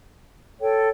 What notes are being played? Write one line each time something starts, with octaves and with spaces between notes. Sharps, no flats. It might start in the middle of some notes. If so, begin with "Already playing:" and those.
A4 C#5 G5